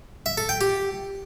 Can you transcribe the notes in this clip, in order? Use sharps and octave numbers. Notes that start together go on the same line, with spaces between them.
E5
A4
G5
G4